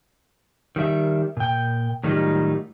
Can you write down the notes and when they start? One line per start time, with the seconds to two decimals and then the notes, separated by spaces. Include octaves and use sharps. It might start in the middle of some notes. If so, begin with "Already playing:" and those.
0.76 D#3 G3 E4 E5
1.37 A#2 G5
2.04 A2 D#3 F#3 G3 D#4 F4